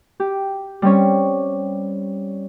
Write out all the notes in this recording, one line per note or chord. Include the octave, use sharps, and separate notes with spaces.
G4
G3 C4 C#4 C#5